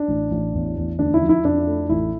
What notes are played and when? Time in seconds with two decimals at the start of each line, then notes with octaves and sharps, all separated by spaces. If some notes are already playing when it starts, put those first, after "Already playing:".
Already playing: D4
0.08 A1
0.31 A1
0.54 E2
0.77 E2
0.99 D2 D4
1.14 E4
1.22 F3
1.29 E4
1.44 F2 D4
1.67 A3
1.89 A1 E4